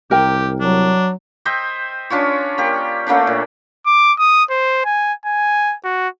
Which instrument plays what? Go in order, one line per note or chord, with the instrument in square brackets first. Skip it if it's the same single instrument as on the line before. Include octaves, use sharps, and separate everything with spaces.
[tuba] C2 [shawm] G4 [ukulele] A#4 G5
[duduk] F#3 [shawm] D4
[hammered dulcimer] C5 D#5 E5 G5
C#4 D4 F4 C#5
A#3 G4
A3 A#3 C#4 D4
A#2
[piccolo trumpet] D6
D#6
C5
G#5
G#5
F#4